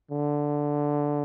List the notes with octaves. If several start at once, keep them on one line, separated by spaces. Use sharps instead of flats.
D3